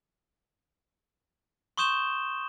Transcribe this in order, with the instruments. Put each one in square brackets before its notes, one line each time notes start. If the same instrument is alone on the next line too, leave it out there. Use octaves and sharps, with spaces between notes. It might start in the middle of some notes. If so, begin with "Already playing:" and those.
[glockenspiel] C6 C#6 D#6 G6 E7 G7